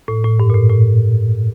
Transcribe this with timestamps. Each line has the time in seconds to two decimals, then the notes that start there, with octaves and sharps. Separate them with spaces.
0.08 A2
0.24 A2
0.40 G2
0.50 A#2
0.54 A2
0.70 A2